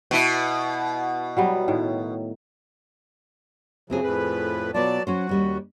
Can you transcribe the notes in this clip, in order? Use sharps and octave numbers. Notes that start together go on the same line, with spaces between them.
B2 E4
F#3 G3 B3
A2 D#3
C#3 F3 F#3 A3 C4 G#4
F2 A2 B4
B2 F#3 B3 F4 D5 A5
F#3 C#4 F#4 C5
D#2 G3 C#4